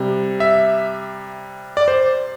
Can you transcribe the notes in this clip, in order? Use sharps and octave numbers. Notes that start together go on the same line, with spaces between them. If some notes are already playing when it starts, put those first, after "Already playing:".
Already playing: C3 G3
E5
D5
C5